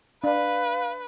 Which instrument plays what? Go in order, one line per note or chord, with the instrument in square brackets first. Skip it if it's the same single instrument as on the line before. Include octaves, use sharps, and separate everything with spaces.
[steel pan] D4 [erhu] B4 [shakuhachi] F5